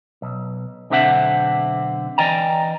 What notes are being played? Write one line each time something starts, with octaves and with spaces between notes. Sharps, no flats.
B1
B1 D3 C4 D4 E5 F#5
E3 D5 D#5 G5 G#5 A#5